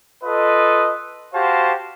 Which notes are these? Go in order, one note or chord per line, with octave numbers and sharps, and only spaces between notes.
F4 A4 B4 D#5
F#4 G4 C5 F5 A5